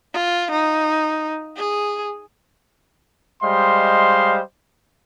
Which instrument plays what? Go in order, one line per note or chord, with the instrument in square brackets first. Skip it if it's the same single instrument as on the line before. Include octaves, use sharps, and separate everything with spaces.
[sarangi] F4
D#4
G#4
[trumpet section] G3 G#3 C5 D#5 F5 C6